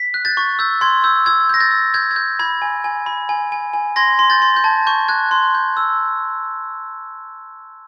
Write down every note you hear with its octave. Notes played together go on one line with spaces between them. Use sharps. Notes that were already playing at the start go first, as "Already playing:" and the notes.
Already playing: B6
F#6
G6 A6
C#6
E6 G6
C6 G#6
E6 G6
E6 G#6
G6
A#6
G6 A6
E6
G6 G#6
G#6
G6
B5 G#6
G#5
G#5
B5
G#5
G#5
G#5
C6 G#6 A#6
C6
G6 A6
C6
G6
A5 G#6
C#6 G6
F#6 G#6
C6
G6
E6